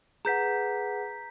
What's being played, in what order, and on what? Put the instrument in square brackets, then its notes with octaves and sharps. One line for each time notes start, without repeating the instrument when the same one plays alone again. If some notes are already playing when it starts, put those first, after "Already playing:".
[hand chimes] G#4 B4 F#5 [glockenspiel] A#5 G6 B6